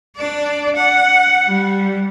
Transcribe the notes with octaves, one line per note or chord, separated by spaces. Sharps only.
D4 D5
F#5
G3